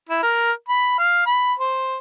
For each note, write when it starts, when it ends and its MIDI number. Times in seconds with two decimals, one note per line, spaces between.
0.09 0.22 64
0.23 0.52 70
0.69 0.95 83
0.99 1.22 77
1.26 1.53 83
1.59 1.98 72